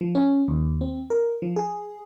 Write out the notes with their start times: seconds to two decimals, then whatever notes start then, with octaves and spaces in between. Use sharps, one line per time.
0.01 F3
0.15 C#4
0.48 D#2
0.81 C4
1.10 A#4
1.42 F3
1.56 G#4